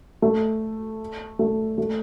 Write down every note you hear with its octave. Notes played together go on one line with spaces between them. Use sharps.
A3
A3
A3